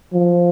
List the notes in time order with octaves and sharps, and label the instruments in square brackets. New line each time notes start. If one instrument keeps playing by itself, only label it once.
[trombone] F3